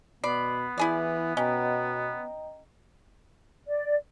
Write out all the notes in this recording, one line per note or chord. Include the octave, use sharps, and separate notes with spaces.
B2 B3 D5 B5 C7
E3 E4 G#4 D5
B2 C#4 D#5 G5 A#5
D5